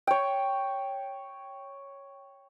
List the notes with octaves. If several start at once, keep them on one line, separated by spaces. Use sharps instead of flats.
C#5 G5